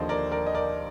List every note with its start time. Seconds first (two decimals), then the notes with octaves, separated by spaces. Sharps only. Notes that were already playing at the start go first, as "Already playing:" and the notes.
Already playing: D#2 D3 F3 C5 D#5
0.09 A#4 D5
0.31 A#4 D5
0.47 D#5
0.54 A#4 D5